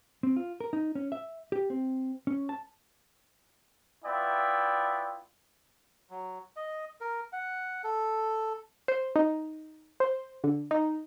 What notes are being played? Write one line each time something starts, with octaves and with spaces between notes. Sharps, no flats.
C4
F4
A#4
D#4
C#4
E5
G4
C4
C#4
A5
B3 E4 F4 D5 E5 G5
F#3
D#5
A#4
F#5
A4
C5
D#4
C5
D3
D#4